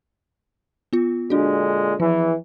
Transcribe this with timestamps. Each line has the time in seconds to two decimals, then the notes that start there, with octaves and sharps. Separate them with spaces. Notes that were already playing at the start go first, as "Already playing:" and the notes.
0.93 B3 F4
1.30 A#2 D3 G#3 D4 F#4
2.00 E2 E3 F3